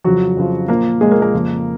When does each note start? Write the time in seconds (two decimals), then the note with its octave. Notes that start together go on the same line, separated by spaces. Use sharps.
0.04 F2 C#3 F3 F#3 F#4
0.37 F2 C#3 F3
0.68 A#2 F3 A#3 A#4
1.00 A#2 F3 G#3 G#4
1.11 A#3 A#4
1.22 A#3 A#4
1.33 F2 C#3 F3